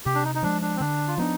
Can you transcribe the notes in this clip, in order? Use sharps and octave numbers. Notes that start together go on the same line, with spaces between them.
C3 G4
D4
D#4
D#4
F3 G#3 D4
D4
C4
D3 D4
F4
F3 B3 D4 D#4